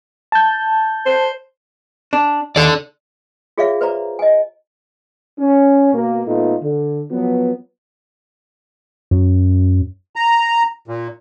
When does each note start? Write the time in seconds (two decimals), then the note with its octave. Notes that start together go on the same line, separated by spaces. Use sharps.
0.32 A5 G6
1.06 C5
2.13 D4
2.56 D#2 A4 D5
3.58 F4 G#4 C#5 D5 E5 F5
3.81 B4 C5 D5 A#5
4.19 D#5 G#5
5.39 C#4
5.94 B2 A#3
6.27 A#2 A3 B3 D#4 F4
6.62 D3
7.11 F3 F#3 B3
9.11 F#2
10.16 A#5
10.88 A#2